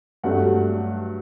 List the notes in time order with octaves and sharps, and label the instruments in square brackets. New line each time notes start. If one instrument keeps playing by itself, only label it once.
[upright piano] G2 F#3 A3 F#5